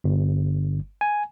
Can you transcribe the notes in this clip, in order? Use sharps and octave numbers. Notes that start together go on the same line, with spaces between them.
G1
G#5